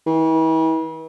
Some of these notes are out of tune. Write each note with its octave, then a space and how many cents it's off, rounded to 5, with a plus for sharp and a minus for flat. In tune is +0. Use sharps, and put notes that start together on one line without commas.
E3 -40